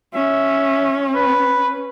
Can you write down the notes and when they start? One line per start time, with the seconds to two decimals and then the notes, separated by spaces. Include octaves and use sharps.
0.14 C#4 E5
1.15 B4